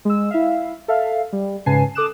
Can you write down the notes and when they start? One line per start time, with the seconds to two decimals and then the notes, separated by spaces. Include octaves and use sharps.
0.05 G#3 E6
0.31 E4 E5 F5
0.88 A4 E5 F5
1.33 G3
1.66 G#2 C#3 B4 G#5 A5 C7
1.95 A4 D6 D#6 F#6 E7